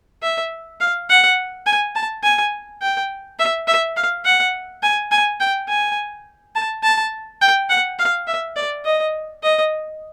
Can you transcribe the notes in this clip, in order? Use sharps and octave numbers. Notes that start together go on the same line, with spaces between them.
E5
F5
F#5
G#5
A5
G#5
G5
E5
E5
F5
F#5
G#5
G#5
G5
G#5
A5
A5
G5
F#5
F5
E5
D5
D#5
D#5